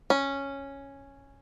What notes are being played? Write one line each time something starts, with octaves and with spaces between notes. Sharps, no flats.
C#4